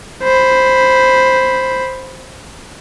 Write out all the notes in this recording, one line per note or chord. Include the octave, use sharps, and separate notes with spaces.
C5 B5